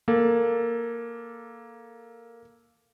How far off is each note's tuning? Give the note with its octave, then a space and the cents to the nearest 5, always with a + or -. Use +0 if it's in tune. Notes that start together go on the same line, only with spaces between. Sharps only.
A#3 +0 A4 +0